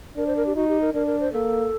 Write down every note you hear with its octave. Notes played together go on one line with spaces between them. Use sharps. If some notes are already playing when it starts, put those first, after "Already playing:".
D4 A#4
C5
A#4
G4
D#4 F#4
G4
A#4
D4 A#4
A#4
C5
A#3 A4